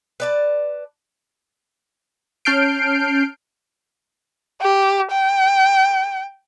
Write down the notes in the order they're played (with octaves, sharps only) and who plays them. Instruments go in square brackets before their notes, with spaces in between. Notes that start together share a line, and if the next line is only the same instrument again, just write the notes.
[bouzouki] B4 D5 A5
[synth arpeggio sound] C#4 A5 F6 G6 C7 D7
[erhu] G4
G5